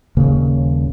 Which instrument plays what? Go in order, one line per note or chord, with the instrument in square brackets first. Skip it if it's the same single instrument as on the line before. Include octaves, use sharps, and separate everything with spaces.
[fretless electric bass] D#1 C#3 A#3